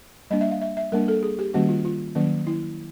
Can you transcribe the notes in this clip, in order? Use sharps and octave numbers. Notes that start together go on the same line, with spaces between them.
G3 A#3 D4 D#5
E5
F5
E5
E5
G3 A#3 D4 A#4
A4
G#4
G4
D#3 G3 A#3 C#4 F#4
F4
F4
D#3 F#3 A#3 C#4
E4